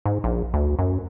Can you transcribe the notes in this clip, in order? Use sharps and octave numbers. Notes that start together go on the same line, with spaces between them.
G#2
A#1
D2
F#2